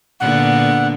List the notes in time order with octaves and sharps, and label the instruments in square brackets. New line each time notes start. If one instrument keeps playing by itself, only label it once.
[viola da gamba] A#2 D3 B3 [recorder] F#5